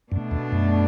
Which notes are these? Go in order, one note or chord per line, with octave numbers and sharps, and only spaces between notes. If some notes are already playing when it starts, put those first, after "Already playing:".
F#2 B2 A3 D4
E2
F#2